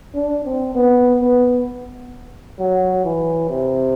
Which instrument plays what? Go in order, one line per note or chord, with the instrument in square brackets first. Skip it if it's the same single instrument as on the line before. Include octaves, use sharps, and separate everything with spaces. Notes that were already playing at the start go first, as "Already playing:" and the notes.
[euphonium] D4
C4
B3
B3
F#3
E3
C3